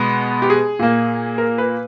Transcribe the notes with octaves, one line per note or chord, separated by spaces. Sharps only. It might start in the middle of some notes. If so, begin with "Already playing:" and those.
Already playing: B2 G#3 B3
G4
G#4
A#2 A#3
A#4
B4